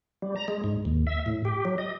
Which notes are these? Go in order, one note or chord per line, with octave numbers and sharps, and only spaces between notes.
G3
A#5
G#3
G#2
D#2
E5
A2
G4
F#3
D#5